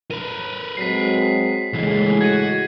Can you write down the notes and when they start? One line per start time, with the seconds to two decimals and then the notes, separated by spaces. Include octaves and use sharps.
0.11 A#4 B4 D#7
0.77 F#3 G#3 C4 B6 C7
1.73 C#2 A2 E3 G#3 C7
2.21 F#4 G#6 D#7